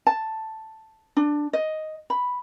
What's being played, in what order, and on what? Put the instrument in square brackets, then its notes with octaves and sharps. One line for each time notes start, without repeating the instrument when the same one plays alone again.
[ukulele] A5
D4
D#5
B5